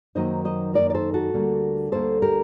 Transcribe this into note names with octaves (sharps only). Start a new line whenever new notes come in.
F#2 D#3 F#3 A#3 D#4 C5 D#5
C5 D#5
F#2 D#3 F#3 A#3 D#4 A#4 D5
D5
A4 C5
F#4 A4
D2 D3 G3 A#3
D2 D3 G3 A#3 A4 C5
G4 A#4